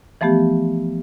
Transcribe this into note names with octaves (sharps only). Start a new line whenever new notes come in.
E3 F3 A3 B3 G4